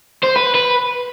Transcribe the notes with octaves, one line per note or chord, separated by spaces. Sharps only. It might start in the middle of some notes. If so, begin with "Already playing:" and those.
C5
B4
B4